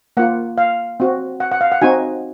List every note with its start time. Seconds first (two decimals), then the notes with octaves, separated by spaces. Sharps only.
0.17 A#3 F4 F#5
0.58 F5
1.00 C4 F#4
1.40 F#5
1.52 F#5
1.61 F5
1.72 F#5
1.82 C4 D#4 F#4 G#5